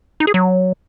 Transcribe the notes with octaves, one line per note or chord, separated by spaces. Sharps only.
D#4
G#4
F#3